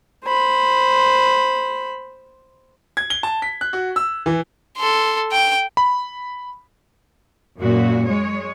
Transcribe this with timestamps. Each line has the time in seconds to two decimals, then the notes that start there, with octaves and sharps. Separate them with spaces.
0.25 C5 B5
2.97 G#6
3.10 G7
3.23 A5
3.42 B6
3.61 F#6
3.73 F#4
3.96 E6
4.26 E3
4.77 A4 C6
5.32 G5
5.77 B5
7.60 F#2 A#2 F#4
8.07 G#3 C#5